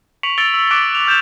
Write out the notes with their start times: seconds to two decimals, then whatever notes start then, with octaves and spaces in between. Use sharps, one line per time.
0.23 C#6 B6 C#7 D7 F7 F#7
0.38 E6 A6 C#7 D7 F7 G7
0.54 E6
0.71 D6 F#6 B6 D7
0.93 F#6 F7 G7
1.07 F6 G6 E7 F7